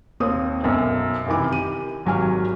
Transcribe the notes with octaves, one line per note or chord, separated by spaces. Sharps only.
D#2 A#3 C4 C#5 D#6
B1 F#2 B2
F#2 C3 D#3 E3 D6
G4 D#7
G#1 F#3 G4 G#5 F6